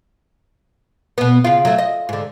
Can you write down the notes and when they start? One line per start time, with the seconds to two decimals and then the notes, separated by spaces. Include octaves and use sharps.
1.18 B2 B3
1.44 C#3 F4
1.65 F#3 A3
1.78 D#5
2.09 G#2 D3